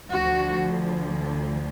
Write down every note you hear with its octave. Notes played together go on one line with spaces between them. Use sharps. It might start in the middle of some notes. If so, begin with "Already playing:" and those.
D2 D3 F3 F#4